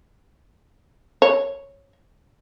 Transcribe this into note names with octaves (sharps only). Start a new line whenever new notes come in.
C#5